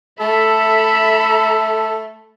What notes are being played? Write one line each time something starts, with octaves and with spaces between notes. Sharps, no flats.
A3 A4 E5 B5